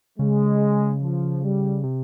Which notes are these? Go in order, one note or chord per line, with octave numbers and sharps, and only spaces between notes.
C#3 G#3
F3
G3
C3